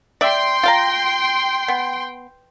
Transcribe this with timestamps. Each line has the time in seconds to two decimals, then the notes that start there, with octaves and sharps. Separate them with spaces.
0.21 D5 E5 G5 C6
0.63 F4 F5 A#5
1.68 B3